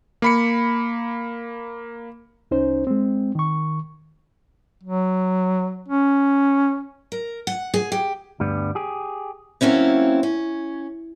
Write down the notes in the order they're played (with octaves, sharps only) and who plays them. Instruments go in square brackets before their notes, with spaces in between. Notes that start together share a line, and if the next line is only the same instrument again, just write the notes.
[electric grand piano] A#3 B5 C#7
[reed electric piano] C2 C#4 D#4 C5
G#3 C4
D#3 C#6
[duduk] F#3
C#4
[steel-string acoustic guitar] A#4
F#5
G#4
G4
[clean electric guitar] D2 G2 G3 B3
G4 G#4
[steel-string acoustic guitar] F#3 A#3 C4 C#4 E4
C#4